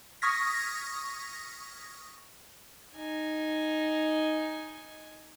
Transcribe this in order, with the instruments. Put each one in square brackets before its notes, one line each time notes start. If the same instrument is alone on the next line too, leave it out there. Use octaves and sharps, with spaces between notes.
[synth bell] C#6 D#6 F6 G#6 A#6 B6
[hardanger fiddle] D#4 G#5